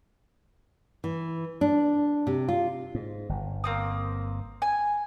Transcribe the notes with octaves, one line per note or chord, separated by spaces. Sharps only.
E3
D4
C3
F4
G#2
G1
A#3 C4 D#6
G#5